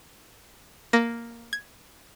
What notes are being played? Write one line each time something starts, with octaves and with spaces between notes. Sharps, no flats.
A#3 A#6
G#6